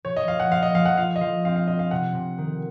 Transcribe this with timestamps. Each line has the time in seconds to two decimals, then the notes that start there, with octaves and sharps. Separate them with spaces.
0.04 F3 C#5
0.16 D#5
0.27 F3 F5
0.40 F#5
0.51 F3 F5
0.63 D#5
0.75 F3 F5
0.86 F#5
0.98 F4 F5
1.16 D#5
1.21 F3 F5
1.45 C4 F5
1.56 F5
1.68 F4 D#5
1.79 F5
1.91 C3 F#5
2.15 C3
2.38 D#3